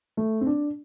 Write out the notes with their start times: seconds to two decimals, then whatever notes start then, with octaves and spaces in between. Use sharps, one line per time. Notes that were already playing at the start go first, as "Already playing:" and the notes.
0.17 A3
0.41 C4
0.46 D4